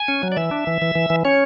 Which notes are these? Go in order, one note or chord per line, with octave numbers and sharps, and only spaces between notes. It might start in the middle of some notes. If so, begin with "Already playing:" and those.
Already playing: G#5
C#4
F#3
D5
E3 E5
D4
E3
E3
E3
E3
C#4 C#5